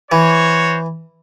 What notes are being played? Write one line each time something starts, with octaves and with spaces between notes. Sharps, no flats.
E3 F#4 C5 C#5